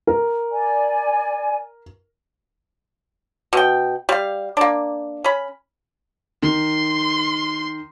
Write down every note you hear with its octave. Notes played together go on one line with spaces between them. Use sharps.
A#4
D5 G#5
B2 G5
G3 F5
A#3 D4
C#4 B5
D#3 C6